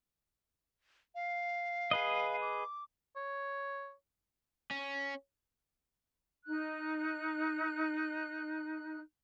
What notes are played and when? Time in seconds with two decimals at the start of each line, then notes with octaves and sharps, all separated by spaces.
1.15 F5
1.91 G#4 B4 D#5
2.41 D6
3.16 C#5
4.71 C#4
6.45 D#4 F#6